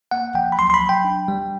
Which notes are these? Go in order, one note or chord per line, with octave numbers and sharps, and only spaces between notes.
A#3 F#5
F3 G5
B5
F#3 C6
C6
B5
F#3
G5
D4
G3